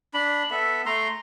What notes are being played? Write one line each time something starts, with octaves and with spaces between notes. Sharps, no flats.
D4 B5
B3 A4 E5
A3 A#5 C6